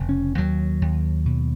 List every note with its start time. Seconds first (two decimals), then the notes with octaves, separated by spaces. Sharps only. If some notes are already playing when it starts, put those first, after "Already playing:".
Already playing: F1 C#3
0.09 C#4
0.38 D#2 F#3
0.82 D#2
1.26 B2